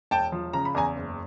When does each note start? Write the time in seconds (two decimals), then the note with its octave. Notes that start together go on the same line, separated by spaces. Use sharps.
0.11 E1 G5 A5
0.32 F3
0.53 C#3 A#5
0.65 B5
0.75 E2 G#5 A#5
0.96 F#1